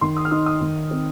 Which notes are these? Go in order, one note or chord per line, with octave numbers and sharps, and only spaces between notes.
D#3 C6
D#6
F6
D#4 D#6
D#6
D#3
C4